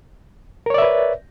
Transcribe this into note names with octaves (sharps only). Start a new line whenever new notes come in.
A#4 B4 C#5 D5 E5